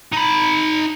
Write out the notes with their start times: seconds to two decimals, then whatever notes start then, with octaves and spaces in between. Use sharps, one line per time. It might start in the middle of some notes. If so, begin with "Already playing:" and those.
0.13 D#4 B5